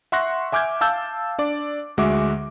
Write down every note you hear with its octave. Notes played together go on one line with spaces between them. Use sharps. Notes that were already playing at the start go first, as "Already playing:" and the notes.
E5 F#5 C6 C#6 F#6 A#6
E5 G#5 D6 F6 G6 G#6
F5 A5 E6 G6
D4 D5 D6
D2 G#3 F#4 E5 D6